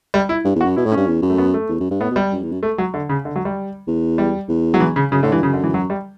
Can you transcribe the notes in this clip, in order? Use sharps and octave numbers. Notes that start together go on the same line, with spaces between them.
G3
E4
G2
E2
F#4
F#2
B2 E4
A2
C#4
G2
E2
F#2
A3
B3
A3
E2
F#2
G2
A2 B3
B2
G3
F#2
E2
F#2
A3
F#3
D3
C#3
D3
F#3
G3
E2
G3
E2
F#3
E3
C#3
F#2 C#3
A2 D3
G2 E3
F#2 C#3
D3
E3
F#3
G3